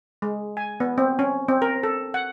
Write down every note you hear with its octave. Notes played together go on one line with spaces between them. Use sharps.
G#3
G#5
B3
C4
C#4
C4
A#4
A4
F#5